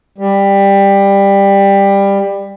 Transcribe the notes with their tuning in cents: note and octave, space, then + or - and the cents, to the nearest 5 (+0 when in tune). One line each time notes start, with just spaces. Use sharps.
G3 +15